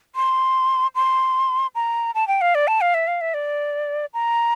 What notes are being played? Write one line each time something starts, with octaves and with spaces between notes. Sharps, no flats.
C6
C6
A#5
A5
G5
F5
D5
A5
F5
E5
F5
E5
D5
A#5